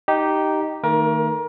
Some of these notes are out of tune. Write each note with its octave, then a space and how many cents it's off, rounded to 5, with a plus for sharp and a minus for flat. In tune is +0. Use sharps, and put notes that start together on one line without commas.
D#4 +0 G4 -10
D#3 +0 A3 +40 A#4 +30